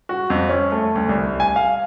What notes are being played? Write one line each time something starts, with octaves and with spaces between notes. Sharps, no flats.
F#4
F2
C#4
A3
D2
C2
G#5
F5